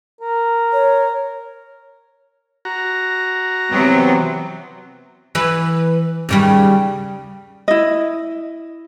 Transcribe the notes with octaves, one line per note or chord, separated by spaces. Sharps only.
A#4
C#5
F#4 A#5
C3 E3 F#3 B3 C4
E3 B4
D#2 C#3 G3
E4 D#5